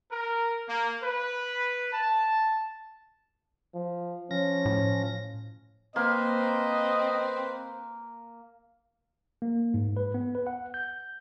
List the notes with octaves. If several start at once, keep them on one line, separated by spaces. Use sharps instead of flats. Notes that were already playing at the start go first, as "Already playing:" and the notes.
A#4
A#3
B4
A5
F3
F3 C#4 A#6
A2
A#3 C4 B4 C5 D#5
A#3
G#2
B4
B3
B4
F#5
G6